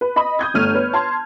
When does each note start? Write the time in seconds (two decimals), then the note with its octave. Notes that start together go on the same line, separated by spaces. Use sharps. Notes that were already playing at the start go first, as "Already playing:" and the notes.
0.01 B4
0.16 D#5 B5 D#6
0.39 D#6 G6 G#6
0.54 G1 A3 F6 D#7
0.74 B4 C#5
0.93 A5 C6 G#6